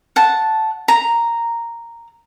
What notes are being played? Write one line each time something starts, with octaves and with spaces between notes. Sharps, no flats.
F#5 A5
A#5